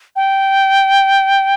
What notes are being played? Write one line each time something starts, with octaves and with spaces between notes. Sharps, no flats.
G5